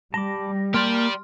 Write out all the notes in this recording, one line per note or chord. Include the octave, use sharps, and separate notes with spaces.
G3 A5 B5 D6 A#6
A#3 G4 D5 A5 C6 F6 G6